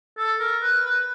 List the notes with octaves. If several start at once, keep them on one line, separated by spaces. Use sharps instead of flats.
A4
A#4
B4
B4